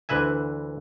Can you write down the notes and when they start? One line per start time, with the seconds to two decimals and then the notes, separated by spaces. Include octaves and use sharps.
0.09 D2 E3 B4 E5 G#5